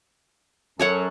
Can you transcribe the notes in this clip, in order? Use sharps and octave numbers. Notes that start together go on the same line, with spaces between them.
F#2 F#3 A4 C#5 F#5